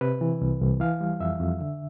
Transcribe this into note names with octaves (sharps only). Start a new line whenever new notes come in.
C3 B4
E3
C2
C2
E3 F5
G3
F2 E5
F2
D3